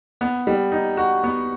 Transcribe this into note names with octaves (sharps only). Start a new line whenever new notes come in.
B3
G3
D#4
F#4
B3